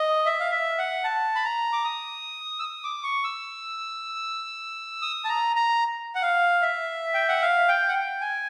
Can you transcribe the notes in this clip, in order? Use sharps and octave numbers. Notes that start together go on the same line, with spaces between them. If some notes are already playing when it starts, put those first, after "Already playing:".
Already playing: D#5
E5
F5
E5
F#5
A5
B5
A#5
D6
D#6
E6
D#6
D6
C#6
E6
D#6
A5
A#5
A#5
F#5
F5
E5
G5
F#5
F5
G5
F#5
G5
G#5